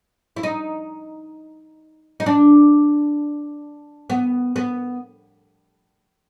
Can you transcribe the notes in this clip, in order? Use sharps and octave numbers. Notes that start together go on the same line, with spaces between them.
E4
D#4
D#4
D4
B3
B3